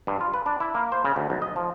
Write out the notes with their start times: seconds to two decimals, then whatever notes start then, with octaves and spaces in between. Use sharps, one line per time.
0.07 G2
0.21 F4
0.34 B4
0.46 D4
0.60 E4
0.75 A#3
0.92 C5
1.04 C#3
1.16 D2
1.30 B1
1.42 D#5
1.56 F3